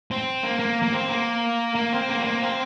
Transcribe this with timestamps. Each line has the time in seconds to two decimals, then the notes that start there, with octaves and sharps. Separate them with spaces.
0.11 C4
0.43 A#3
0.59 A#3
0.83 A#3
0.93 C4
1.09 A#3
1.75 A#3
1.93 C4
2.09 A#3
2.18 C4
2.25 A#3
2.42 C4